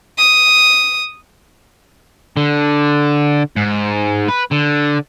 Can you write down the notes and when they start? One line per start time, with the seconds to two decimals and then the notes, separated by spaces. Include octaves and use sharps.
0.18 D#6
2.37 D3
3.56 G#2
4.28 B4
4.51 D3